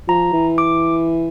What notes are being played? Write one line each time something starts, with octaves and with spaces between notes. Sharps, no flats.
F3 A#5
E3
D6